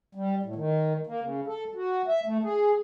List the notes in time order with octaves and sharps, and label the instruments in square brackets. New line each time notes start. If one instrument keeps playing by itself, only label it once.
[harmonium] G3
A2
D#3
A#3
C#3
A4
F#4
E5
A3
G#4